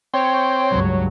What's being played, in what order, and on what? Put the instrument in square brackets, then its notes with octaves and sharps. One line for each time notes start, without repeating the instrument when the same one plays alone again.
[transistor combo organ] C4 [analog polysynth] C#5 [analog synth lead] G5
[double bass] C#2 G2 [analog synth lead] F#3